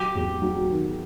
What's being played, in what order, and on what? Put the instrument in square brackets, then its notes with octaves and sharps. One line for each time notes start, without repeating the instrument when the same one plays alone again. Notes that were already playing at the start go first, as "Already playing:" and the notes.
Already playing: [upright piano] F#3 [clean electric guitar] G4
[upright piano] E2
F#3
D#3